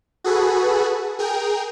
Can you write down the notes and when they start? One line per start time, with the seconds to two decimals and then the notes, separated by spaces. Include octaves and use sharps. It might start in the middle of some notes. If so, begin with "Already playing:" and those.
0.24 F#4 G#4 A4 B4
1.19 G#4 A#4 G5